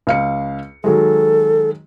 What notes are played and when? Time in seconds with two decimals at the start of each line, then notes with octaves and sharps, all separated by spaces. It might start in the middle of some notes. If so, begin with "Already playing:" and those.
0.07 C#2 F5 C#7
0.84 D#3 F#3 G#3 A4